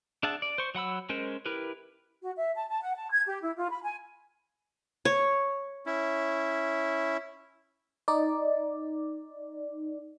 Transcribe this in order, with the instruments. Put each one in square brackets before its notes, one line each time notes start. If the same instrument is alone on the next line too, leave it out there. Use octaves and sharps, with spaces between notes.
[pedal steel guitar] D4 G#4 E5 F#5 A5
D5
C5 C#6
F#3 F#5 B5 E6
G#3 C#4 A#4 C5
E4 G4 A#4 B4
[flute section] F#4
E5
A5
A5
F#5
A5
G#6
G4
E4
F4
B5
G#5
[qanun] C#5
[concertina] C#4 E4
[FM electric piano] D#4 D5